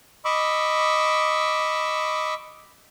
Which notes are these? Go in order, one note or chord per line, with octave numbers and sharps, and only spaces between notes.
D#5 B5 C#6 D6 E6